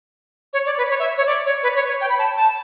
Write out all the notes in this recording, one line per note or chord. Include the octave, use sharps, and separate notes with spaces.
C#5
D5
B4
C#5
E5
C#5
D5
C#5
B4
C#5
C#5
G5
B5
A5
A5